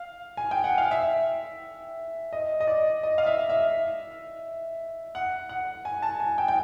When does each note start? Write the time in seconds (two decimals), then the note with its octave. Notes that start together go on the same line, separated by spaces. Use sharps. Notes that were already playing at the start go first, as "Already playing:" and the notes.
Already playing: F5
0.37 G#5
0.51 G5
0.64 F#5
0.78 F5
0.91 E5
2.33 D#5
2.61 D#5
2.67 D5
3.03 D#5
3.18 F5
3.26 E5
3.49 E5
5.15 F#5
5.49 F#5
5.85 G#5
6.02 A5
6.20 G#5
6.38 G5
6.48 G5